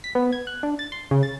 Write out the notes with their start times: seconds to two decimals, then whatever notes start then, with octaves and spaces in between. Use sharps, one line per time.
0.04 B6
0.15 B3
0.32 G#6
0.47 F#6
0.63 D4
0.79 A6
0.92 C6
1.11 C#3
1.23 A6